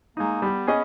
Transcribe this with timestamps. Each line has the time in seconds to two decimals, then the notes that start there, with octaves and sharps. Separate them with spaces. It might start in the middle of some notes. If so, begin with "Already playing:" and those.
0.17 G#3 A#3 D#4
0.42 G3 B3
0.67 C#4 G#4 D#5